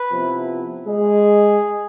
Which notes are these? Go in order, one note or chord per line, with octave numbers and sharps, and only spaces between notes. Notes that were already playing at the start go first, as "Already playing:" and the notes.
Already playing: B4
C3 F3 B3 E4
G#3 G#4